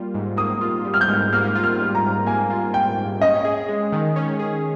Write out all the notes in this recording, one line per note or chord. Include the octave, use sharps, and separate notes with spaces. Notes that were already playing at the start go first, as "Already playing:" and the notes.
Already playing: G3 A#3 F4
G#2
A#3 D#6
F4
G3
F6
G6
G#2
A#3 F6
F4
F6
G3
A#5
G#2
A#3 G#5
F4
G3 G5
G#2
C#4 D#5
G#4
G#3
D#3
C#4
G#4